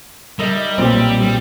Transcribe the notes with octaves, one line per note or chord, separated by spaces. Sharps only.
G3 D#4 A#4 E5
B1 A#2 C4 G4
G3